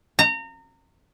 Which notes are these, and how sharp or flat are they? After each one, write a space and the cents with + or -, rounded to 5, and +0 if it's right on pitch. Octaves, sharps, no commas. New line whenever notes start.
A#5 -30